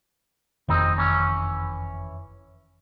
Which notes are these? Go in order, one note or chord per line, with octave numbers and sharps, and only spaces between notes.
F#1 F2 D#3 C4 D#4
E3 C#4